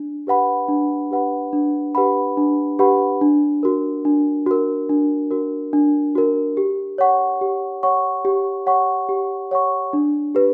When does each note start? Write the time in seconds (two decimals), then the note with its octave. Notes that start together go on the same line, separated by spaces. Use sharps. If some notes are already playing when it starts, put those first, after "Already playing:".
Already playing: D4
0.27 G4 B4 F#5 B5
0.68 D4
1.11 G4 B4 F#5 B5
1.53 D4
1.95 G4 B4 F#5 B5
2.37 D4
2.79 G4 B4 F#5 B5
3.21 D4
3.63 F#4 A#4
4.05 D4
4.46 F#4 A#4
4.89 D4
5.31 F#4 A#4
5.73 D4
6.15 F#4 A#4
6.57 G4
6.98 C#5 F#5 C#6
7.41 G4
7.83 C#5 F#5 C#6
8.25 G4
8.66 C#5 F#5 C#6
9.09 G4
9.51 C#5 F#5 C#6
9.93 D4
10.35 G4 B4